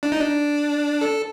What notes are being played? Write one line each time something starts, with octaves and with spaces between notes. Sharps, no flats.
D4
D#4
D4
A4